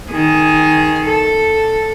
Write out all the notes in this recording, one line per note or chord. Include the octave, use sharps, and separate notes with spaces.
D#3 G#4
A4